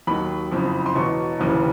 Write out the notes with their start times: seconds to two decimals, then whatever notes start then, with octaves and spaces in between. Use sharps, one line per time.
0.07 D#2 D#3 F#3 B5
0.52 F#1 F2 C#3
0.86 C6
0.95 E1 E2 B2 C#6
1.39 F1 D#2 C#3 E3